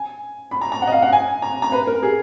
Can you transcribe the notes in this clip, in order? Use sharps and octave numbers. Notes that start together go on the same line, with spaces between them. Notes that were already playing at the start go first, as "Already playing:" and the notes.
Already playing: G#5
B5
A#5
A#5
F#5
D#5
F5
F#5
G#5
A#5
A#5
B4
A#4
G#4